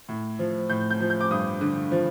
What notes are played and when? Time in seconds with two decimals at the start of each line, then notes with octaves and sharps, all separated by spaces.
0.09 A2
0.39 F3
0.70 A2 G6
0.90 G6
1.00 F3
1.10 G6
1.21 D6
1.31 G2 D#6
1.61 D3
1.91 F3